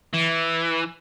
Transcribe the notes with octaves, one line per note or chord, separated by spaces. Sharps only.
E3